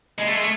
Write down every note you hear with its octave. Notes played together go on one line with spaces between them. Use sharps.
G#3
A3
G#3
A3